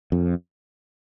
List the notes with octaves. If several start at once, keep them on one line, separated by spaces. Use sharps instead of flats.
F2